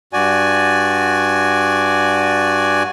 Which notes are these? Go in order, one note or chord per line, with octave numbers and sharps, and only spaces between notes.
G2 F#4 D5 G#5